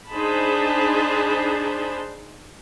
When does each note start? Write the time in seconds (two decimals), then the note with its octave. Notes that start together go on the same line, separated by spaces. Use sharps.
0.11 D4 D#4 G#4 C5 A5 B5